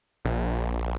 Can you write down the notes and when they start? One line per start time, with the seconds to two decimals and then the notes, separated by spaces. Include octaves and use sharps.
0.25 A#1